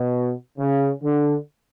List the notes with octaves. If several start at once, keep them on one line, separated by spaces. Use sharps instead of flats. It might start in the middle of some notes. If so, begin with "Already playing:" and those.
Already playing: B2
C#3
D3